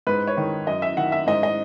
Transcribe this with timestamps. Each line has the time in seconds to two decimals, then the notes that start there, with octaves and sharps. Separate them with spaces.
0.07 G#2 B4
0.27 C#5
0.37 D#3
0.67 F#2 D#5
0.82 E5
0.97 D#3 F#5
1.12 E5
1.27 G#2 D#5
1.43 D#5